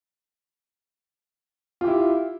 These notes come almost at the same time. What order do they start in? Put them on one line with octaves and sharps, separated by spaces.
F4 G4 E4